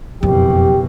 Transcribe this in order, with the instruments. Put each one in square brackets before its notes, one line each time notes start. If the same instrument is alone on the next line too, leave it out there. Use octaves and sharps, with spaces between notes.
[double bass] F#1 B2 [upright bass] F2 [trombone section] G4